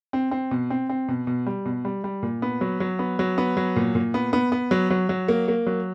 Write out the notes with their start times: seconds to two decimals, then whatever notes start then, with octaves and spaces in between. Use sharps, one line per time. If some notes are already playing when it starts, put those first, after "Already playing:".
0.13 C4
0.31 C4
0.51 B2
0.70 C4
0.89 C4
1.08 B2
1.27 B2
1.46 G3
1.65 B2
1.85 G3
2.04 G3
2.23 A#2
2.42 B3
2.61 F#3
2.80 F#3
2.99 B3
3.19 F#3
3.38 B3
3.57 F#3
3.76 A#2
3.95 A#2
4.14 B3
4.33 B3
4.52 B3
4.71 F#3
4.90 F#3
5.09 F#3
5.28 A#3
5.48 A#3
5.67 F#3